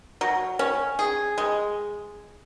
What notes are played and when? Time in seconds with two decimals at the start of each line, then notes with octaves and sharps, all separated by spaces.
0.21 F#3
0.59 C#4
0.99 G#4
1.38 G#3